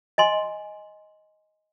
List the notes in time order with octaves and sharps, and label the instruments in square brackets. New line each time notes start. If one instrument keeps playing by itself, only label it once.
[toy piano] D#5 G#5 C6